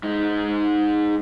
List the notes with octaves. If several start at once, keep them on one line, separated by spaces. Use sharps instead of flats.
G#2 D#4